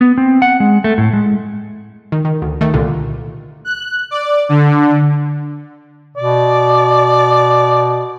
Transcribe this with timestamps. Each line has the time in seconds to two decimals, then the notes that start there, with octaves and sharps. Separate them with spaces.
0.01 B3
0.18 C4
0.42 F#5
0.60 G#3
0.84 A3
0.98 A2
1.13 G#3
2.12 D#3
2.25 D#3
2.42 D2
2.61 D#3 A3
2.74 C2 A#2 D3
3.65 F#6
4.11 D5
4.49 D3
6.17 B2 D5